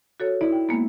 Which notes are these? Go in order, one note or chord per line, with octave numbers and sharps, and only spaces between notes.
F#4 A4 C#5
E4 D5
G5
G#3 A#3 B3